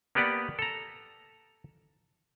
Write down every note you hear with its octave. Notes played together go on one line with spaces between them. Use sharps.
A#3 B3 G4 B4 D5 F#5
A4 A#5